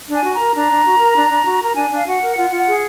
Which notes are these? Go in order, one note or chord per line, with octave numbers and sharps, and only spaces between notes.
D4
G#5
F#4
A#5
A#4
D4 A#5
D4
F#4
A#4
D4
D4
F#4
A#4 A#5
D4 G#5
D4 F5
F#4 F#5
A#4
F4 F#5
F4
F#5
G#4